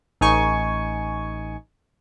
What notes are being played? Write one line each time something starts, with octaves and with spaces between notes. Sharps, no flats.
A1 D#4 G#5 C#6